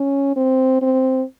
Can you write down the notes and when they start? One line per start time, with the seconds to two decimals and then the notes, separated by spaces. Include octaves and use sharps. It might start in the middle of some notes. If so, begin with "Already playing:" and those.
Already playing: C#4
0.36 C4
0.82 C4